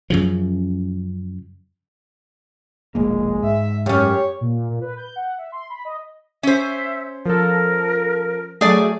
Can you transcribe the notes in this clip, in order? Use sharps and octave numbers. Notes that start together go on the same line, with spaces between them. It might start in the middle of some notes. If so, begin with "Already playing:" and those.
F#2 C#3 F3
E1 A#1 G#3 A#3
G#2 E5
F#2 C#4 G4 C#5
A#2
A#2
B4
G6
F#5
E5
C6
B5
D#5
C#4 C5 E5
F3 A4 A#4
F#3 A3 G#4 D5 G#5